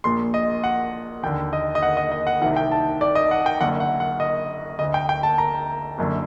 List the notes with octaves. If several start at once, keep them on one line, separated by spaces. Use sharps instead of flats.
A#1 A#2 C6
D#5
F#5
D#2 D3 G5
D#5
D#5
F#5
D#5
D#5
F#5
C2 C3 D#3 F#5
G5
A5
D5
D#5
F#5
G5
F#1 F#2 D3 F#5
F#5
F#5
D#5
D2 D3 D#5
G5
G5
A5
A#5
F#1 F#2 D3